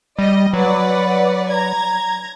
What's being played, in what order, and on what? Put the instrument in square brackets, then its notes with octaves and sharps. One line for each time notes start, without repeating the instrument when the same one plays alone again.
[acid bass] G3 [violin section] D#5
[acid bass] F#3 [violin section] B4 D5 F#5
[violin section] A#5 G#6